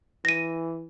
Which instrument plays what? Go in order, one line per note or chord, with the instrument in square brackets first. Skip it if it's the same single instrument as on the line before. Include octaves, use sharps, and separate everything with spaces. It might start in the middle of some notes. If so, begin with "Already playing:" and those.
[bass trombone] E3 [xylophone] A#6 D#7